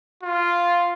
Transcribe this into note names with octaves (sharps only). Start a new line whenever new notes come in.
F4